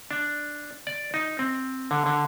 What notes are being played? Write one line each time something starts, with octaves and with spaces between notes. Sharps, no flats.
D4
D5
D#4
C4
D3
D3